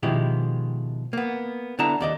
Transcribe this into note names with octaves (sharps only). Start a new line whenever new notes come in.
B2 D#3 F3 G#3 E4 G4
A#3 B3
D3 B3 E4 A5 A#5
D#2 D5 D#5